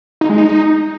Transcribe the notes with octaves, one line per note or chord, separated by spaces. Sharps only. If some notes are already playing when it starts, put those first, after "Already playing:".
D#4
G#3
D#4